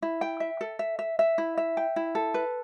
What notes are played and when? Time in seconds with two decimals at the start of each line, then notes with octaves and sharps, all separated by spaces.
0.02 E4
0.21 G5
0.40 E5
0.61 A4
0.79 E5
0.99 E5
1.19 E5
1.38 E4
1.57 E5
1.77 G5
1.96 E4
2.15 A4
2.34 B4